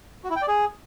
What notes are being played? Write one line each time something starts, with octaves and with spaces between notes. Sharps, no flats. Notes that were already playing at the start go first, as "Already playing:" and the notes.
F#4
E4
G5
D5
G#4